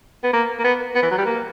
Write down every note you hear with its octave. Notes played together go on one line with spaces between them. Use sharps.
B3
A#3
A#3
B3
B3
E3
F#3
G3
A#3